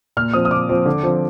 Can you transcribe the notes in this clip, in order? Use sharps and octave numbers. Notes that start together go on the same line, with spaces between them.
A#2 F6
F3 C4 D#6
D#6
A#2 D6
F3 C4
D3
F3 C4